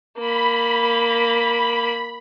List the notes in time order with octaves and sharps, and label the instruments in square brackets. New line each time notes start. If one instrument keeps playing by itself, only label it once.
[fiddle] A#3 [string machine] B5